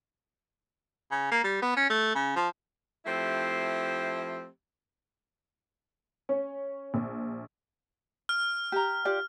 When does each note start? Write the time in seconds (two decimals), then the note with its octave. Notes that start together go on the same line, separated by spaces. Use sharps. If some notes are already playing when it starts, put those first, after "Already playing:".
1.11 C#3
1.31 A#3
1.44 G3
1.62 B3
1.76 C#4
1.90 A3
2.15 C#3
2.36 F3
3.06 F3 A3 C4 E4 G4
6.29 C#4
6.94 A#1
8.29 F6
8.72 G4 A#5
9.05 F4 G4 D5